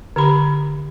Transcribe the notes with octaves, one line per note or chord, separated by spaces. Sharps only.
D3 G4 B5